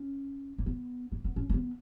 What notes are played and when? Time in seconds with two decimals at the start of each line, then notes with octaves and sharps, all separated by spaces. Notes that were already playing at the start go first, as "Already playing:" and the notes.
Already playing: C#4
0.58 A#3
0.66 B3
1.12 A#3
1.24 B3
1.36 C#4
1.50 A#3
1.54 B3